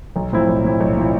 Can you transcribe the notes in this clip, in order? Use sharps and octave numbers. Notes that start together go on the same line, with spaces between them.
B1
A2 F3 C4 E4
B1
A2 F3 C4 E4
B1
A2 F3 C4 E4